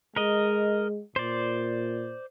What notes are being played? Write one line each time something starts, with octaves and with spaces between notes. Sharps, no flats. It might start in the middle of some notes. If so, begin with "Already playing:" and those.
G#3 A#4 D#5
A#2 C5 D5